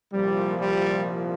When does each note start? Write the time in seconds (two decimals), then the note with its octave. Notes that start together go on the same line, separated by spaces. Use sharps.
0.12 C2 A#2 F3 G3
0.60 G3